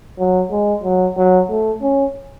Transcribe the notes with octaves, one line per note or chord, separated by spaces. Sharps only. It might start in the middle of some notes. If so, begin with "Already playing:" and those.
F#3
G#3
F#3
F#3
A3
C#4